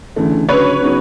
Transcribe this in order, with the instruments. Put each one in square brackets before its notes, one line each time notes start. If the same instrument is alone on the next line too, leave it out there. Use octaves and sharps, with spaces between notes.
[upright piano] D2 C#3 E3 A3
[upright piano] D2 C#3 F#3 [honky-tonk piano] B4 C#5
[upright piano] C#3 F#3 B3 D#4